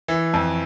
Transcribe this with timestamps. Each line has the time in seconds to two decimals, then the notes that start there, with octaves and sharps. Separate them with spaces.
0.08 E3
0.34 F2